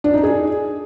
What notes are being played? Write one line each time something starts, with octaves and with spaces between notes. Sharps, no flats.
D4
D#4
G#4